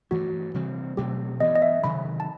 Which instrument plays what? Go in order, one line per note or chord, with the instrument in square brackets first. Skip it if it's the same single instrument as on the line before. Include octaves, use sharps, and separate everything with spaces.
[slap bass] G2 E3 A3 [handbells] F#4
[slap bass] C3 E3 G3 C4
[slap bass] B2 F#3 A3 C4 [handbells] G4
[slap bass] G2 E3 B3 [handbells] D#5
[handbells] D#5
E5
[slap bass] C3 D#3 F#3 [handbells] B5
[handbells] A5